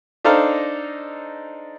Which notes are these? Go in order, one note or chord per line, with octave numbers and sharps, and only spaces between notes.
D4 D#4 A4 C5 F5 A#5